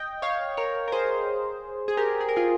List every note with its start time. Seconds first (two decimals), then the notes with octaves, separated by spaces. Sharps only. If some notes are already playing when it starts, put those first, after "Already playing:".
Already playing: D#5 G5
0.22 C#5 F5
0.57 A#4 C#5
0.88 A#4
0.92 G#4 C5
1.88 G#4
1.97 G4 A#4
2.21 G#4
2.29 A#4
2.36 F4 G#4